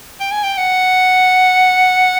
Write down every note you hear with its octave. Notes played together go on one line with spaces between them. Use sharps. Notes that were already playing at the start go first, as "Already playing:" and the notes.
G5
G#5
G5
F#5